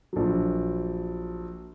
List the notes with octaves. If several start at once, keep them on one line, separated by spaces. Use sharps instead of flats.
A#1 F#3